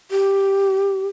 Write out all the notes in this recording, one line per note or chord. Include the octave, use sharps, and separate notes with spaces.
G4